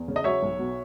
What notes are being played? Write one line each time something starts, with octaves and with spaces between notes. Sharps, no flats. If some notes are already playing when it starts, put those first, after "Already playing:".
Already playing: E2
C#3
D#5
F#3 C#5 E5
B1
B2